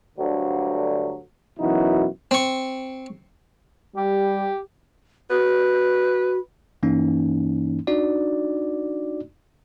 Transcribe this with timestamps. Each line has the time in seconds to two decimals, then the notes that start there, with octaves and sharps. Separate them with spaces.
0.18 D2 G2 D3 F#3
1.59 F#2 B2 E3 D#4 E4 F#4
2.31 C4 C#6
3.96 G3 G4
5.30 F#4 B4
6.83 G2 E3 A#3 C#4 D#4
7.87 D4 D#4 F#4 D5